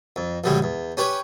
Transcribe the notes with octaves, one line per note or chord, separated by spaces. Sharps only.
F2
A#1 F#2 D3 G3 G#3
E2
C#4 G4 B4 C#5